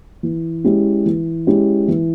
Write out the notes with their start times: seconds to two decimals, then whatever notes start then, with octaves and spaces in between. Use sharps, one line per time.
0.23 E3
0.64 G#3 C#4 E4 G4
1.06 E3
1.47 G#3 C#4 E4 G4
1.88 E3